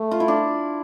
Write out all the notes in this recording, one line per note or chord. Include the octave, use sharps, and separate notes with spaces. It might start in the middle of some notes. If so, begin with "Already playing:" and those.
Already playing: A3
F4
E4
D4